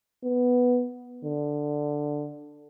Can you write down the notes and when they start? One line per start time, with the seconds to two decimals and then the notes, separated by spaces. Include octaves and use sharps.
0.24 B3
1.25 D3